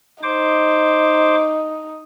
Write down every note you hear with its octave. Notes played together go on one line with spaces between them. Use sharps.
D#4 C5 D6